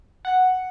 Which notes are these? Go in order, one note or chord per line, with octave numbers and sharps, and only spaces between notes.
F#5